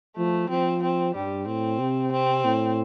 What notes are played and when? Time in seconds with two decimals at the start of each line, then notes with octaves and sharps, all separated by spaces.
0.17 F3 A3
0.49 F3 C4
0.83 C4
1.15 G2 G3
1.47 A2 C4
1.79 C3
2.12 C4
2.45 A2